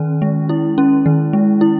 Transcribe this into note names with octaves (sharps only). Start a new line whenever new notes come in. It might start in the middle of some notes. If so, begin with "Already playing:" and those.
Already playing: D#3 C#4
G#3
E4
C#4
D#3
G#3
E4